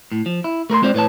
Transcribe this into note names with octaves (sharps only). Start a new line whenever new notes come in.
A2
F3
E4
A3 A#4 B4 C6
G#3 C4 F4 C5 D5
A2 B4 C#5 A5